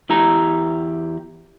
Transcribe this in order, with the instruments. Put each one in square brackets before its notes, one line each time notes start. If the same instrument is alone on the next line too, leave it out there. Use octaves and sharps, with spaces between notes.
[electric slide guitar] E2 E4 G4 A#5